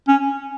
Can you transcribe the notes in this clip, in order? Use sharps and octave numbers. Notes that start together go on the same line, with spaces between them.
C#4